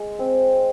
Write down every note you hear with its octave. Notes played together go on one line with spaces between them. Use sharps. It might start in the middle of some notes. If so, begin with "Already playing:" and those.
Already playing: G#3
C4